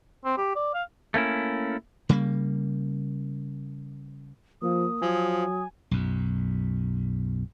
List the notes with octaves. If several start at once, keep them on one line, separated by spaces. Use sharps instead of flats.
C4
G4
D5
F5
A3 A#3 C#4 E4
C#3 G3 A3 A#3
F3 A#3 D#6
F3 F#3 G#5
B1 F#2